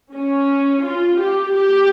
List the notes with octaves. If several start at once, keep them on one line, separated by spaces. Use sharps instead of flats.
C#4
F4
G4
G4